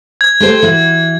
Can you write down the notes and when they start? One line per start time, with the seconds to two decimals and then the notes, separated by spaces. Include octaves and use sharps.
0.21 G#6
0.40 A3 G4 C5
0.62 E3 F#4